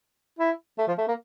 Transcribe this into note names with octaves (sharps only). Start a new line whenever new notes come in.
E4
A3
F3
A3
A#3